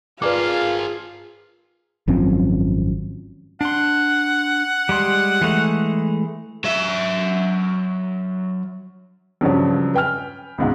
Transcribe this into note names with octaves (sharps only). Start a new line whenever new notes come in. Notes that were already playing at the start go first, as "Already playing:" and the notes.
F4 G#4 A#4 B4 D5 F5 D6
G#1 F#2 F3 C4
D4 F#5 C6
G3 G#3 C6
E3 G#3 A3
F#3 E5
G2 C#3 F3 F#3
B4 G5 G#5 F6
C#2 G#2 B2